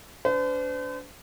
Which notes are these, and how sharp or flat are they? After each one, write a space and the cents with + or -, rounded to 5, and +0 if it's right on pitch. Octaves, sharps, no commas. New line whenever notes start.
D4 -35 C5 -45